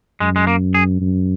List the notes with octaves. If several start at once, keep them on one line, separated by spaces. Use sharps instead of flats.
F#2 G#3
G#3
A#3
G#4
F#2